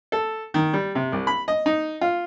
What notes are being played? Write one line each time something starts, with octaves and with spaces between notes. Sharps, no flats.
A4
D#3
G3
C3
C2
B5
D#5
D#4
F4